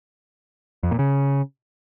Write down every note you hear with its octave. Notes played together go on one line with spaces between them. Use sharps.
F2
A#2
C#3